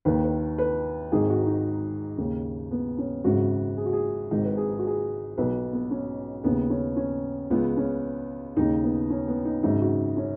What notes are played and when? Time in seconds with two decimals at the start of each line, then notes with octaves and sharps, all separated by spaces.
0.05 D#2 D#3 B4
0.24 B4
0.58 B4
1.12 G#1 G#2 D#3 G#4
1.30 F#4
1.47 D#4
2.18 D#2 C#3
2.71 B3
2.98 C#4
3.24 G#1 F#2 C#3 F#4
3.77 G#4
3.86 F#4
3.93 G#4
4.31 G#1 G#2 D#3 D#4
4.45 B4
4.57 G#4
4.71 G#4
4.79 F#4
4.87 G#4
5.38 B1 B2 B4
5.73 B3
5.91 C#4
6.44 D#2 C#3 B3
6.70 C#4
6.97 C#4
7.50 C#2 C#3 B3
7.77 C#4
8.57 D#2 C#3 D#4
8.84 B3
9.10 C#4
9.28 B3
9.45 D#4
9.63 G#1 F#2 C#3 D#4
9.81 F#4
10.17 C#4